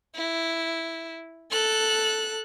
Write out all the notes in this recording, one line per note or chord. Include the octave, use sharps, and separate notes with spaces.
E4
A4 F#6